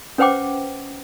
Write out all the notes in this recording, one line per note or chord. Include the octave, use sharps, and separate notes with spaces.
C#4 B4 C5 F#5 G5 D6